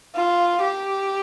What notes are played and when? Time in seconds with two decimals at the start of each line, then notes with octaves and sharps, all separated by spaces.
0.15 F4
0.61 G4